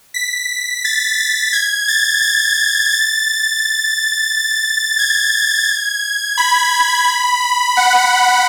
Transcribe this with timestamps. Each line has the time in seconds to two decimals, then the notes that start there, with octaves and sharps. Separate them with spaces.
0.14 B6
0.85 A6
1.18 A6
1.53 G#6
1.88 A6
2.22 A6
2.92 A6
4.99 G#6
6.38 B5
7.77 F#5